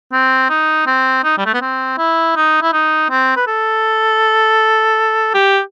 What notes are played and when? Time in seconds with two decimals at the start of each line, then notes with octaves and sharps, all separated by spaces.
0.13 C4
0.50 D#4
0.87 C4
1.24 D#4
1.38 G3
1.46 A3
1.54 B3
1.61 C4
1.98 E4
2.36 D#4
2.62 E4
2.73 D#4
3.10 C4
3.36 B4
3.47 A4
5.34 G4